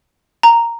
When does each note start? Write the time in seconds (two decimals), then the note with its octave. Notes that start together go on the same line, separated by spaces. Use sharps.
0.43 A#5